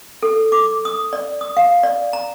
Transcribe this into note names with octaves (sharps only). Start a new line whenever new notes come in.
A4
D6
D#6
D5
D#6
F5
D5
A#5